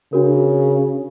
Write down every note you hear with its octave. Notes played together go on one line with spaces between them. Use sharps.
C#3 D4 F#4 A#4